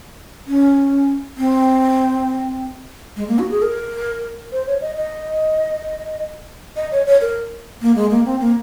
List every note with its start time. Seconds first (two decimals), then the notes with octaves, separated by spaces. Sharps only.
0.47 C#4
1.37 C4
3.16 G#3
3.28 A#3
3.39 F#4
3.51 G#4
3.62 A#4
4.52 C5
4.67 C#5
4.81 D#5
4.96 D#5
6.76 D#5
6.91 C#5
7.06 C#5
7.21 A#4
7.81 A#3
7.95 G#3
8.10 A#3
8.25 C4
8.40 A#3